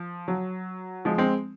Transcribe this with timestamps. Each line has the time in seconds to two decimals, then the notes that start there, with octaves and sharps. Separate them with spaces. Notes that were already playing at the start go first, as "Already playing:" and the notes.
Already playing: F3
0.28 F#3
1.05 F3 G#3
1.18 G#3 C4